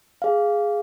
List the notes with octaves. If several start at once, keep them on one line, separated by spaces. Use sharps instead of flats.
G#4 F5